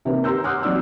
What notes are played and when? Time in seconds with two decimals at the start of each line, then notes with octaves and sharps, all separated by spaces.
0.05 C3 D#3 A#3 B4
0.24 G4 A#5 C6 E6 G6
0.44 F#5 C6 D6 D#6 F6 F#6
0.62 F#3 C4 D#4 D5 E6 F6